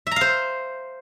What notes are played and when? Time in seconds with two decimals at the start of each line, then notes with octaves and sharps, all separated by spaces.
0.07 E5
0.11 A#5
0.16 F5
0.21 C5